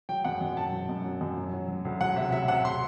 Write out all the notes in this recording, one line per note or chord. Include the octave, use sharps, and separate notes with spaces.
F#3 G5
F#2 F#5
F#2
F#2 A5
F#3
F#2
F#3
F#2
F#3
F#3
F#3
D2
F#3 F#5
C3 E5
F#3 E5
C3 F#5
C6